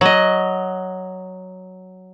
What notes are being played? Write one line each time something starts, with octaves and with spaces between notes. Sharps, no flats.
F#3 D#5